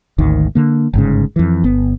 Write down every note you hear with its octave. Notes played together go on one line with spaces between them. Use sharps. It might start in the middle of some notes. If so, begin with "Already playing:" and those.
G#1 D2 D#3
D3 A#3
G1 G#2 C#3
F2 E3
G1 B3